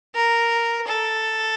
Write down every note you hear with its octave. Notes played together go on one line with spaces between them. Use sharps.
A#4
A4